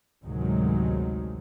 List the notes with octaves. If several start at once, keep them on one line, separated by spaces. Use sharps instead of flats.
A1 D2 C3 D#3 F#3 G#3